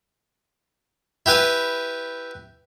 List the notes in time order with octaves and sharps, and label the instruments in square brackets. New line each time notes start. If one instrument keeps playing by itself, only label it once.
[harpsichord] E4 G4 B4 G#5